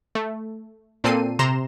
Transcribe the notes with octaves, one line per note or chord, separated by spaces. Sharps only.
A3
A#2 C4 A4 C7 D#7
C3 A#5 C6 E7